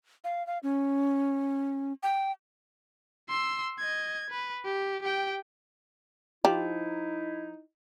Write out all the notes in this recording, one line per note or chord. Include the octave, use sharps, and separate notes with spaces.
F5
F5
C#4
G5
C6 E6
D#5 G#6
B4
G4
G4 G5
F3 D#4 E4 G4